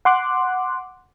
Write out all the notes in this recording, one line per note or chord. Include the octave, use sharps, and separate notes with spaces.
F#5 C6 D6 F#6